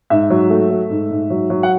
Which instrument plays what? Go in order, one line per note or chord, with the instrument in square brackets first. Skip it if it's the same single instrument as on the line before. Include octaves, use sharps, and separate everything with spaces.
[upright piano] G#2 E5
F#3
A3
A3
G#2
G#2
F#3
F#3
F#5